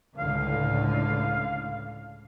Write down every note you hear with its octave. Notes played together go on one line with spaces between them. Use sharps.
C#2 A2 D3 F5